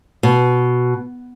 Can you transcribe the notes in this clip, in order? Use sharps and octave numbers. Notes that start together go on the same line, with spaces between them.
B2